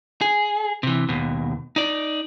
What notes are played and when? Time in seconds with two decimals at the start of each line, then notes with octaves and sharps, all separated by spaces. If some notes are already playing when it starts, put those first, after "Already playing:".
0.21 G#4
0.83 C3 E3
1.09 D#2 B2
1.76 D#4 D5